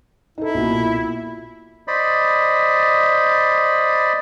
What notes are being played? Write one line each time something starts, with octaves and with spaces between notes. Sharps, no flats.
D#4 E4 A4
B1 A#2
C5 D5 D#5 B5